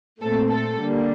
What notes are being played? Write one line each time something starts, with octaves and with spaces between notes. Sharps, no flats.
A#2 A3 C4 A4
A4
D3 G3 A#3